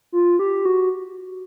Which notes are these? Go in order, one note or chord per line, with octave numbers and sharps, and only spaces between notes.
F4
G4
F#4